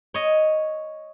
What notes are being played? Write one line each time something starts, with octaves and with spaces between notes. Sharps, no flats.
C#5 D#5